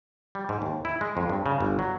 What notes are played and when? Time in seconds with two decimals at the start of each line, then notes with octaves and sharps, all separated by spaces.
0.35 G3
0.49 G#2
0.62 D#2
0.85 E4
1.01 G#3
1.17 F2
1.29 G2
1.46 C#3
1.60 G1
1.79 F#3